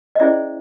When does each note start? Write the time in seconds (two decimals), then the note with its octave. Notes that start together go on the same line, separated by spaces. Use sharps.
0.15 D#5
0.20 C#4 E4 G#4 C5 D5 E5